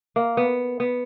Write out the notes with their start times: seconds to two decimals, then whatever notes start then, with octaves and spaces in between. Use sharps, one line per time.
0.16 A#3
0.37 B3
0.80 B3